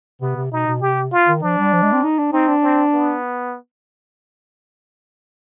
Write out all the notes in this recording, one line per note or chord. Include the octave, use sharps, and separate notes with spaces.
C3 B3
C3
B2 D#4
B2
C3 G4
F4
D#3
F3 D4
G3
F3
G#3
C4
D#4
D4
C4 D#4
D4
C4
B3